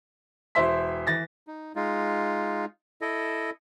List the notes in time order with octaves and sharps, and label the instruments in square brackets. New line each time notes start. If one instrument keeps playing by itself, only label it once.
[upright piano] E1 E4 C5 E5 C6 B6
E3 A6 A#6
[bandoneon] D#4
G#3 D#4 F4
E4 A4 D#5